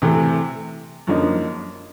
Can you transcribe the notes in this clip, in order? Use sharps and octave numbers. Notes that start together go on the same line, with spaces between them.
C3 E3 A3
F#2 D3 F3 A#3 D#4